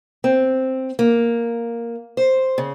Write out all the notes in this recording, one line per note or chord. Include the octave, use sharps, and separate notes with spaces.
C4
A#3
C5
C#3